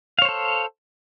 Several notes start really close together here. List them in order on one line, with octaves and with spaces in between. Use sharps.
F5 C#5 C5 A4